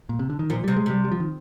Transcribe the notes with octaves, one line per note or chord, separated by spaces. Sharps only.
A#2
C3
D3
D#3
A#2 F3
C3 G3
G#3
C3 G3
G3
F3
D#3